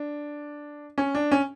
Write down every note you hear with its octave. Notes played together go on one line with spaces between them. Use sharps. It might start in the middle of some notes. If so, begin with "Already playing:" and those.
Already playing: D4
C#4
D4
C#4